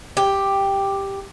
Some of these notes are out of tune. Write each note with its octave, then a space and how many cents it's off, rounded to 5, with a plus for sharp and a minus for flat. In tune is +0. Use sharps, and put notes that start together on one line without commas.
G4 +5